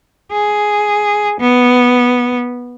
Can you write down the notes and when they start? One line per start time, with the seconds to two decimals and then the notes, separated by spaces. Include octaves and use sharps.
0.32 G#4
1.40 B3